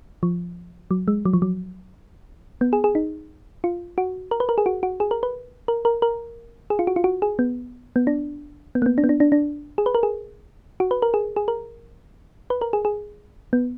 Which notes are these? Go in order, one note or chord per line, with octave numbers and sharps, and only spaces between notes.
F3
F#3
G#3
F#3
F3
F#3
B3
G#4
G#4
D#4
F4
F#4
A#4
B4
A#4
G#4
F#4
F#4
G#4
A#4
B4
A#4
A#4
A#4
G#4
F4
F#4
F4
F#4
G#4
B3
B3
D4
B3
A#3
B3
D4
B3
D4
D4
D4
G#4
B4
A#4
G#4
F#4
B4
A#4
G#4
G#4
A#4
B4
A#4
G#4
G#4
B3